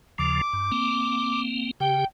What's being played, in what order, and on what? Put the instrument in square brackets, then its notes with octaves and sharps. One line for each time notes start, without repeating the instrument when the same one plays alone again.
[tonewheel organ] D#2 C#3 F3 [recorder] D6
[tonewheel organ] G2
A#3 C4
[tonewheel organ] C#3 G4 [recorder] G5